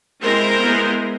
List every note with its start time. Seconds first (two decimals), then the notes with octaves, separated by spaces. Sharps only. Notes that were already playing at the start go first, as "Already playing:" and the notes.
0.22 G#3 C4 E4 A#4 C5
0.60 G#3 B3 E4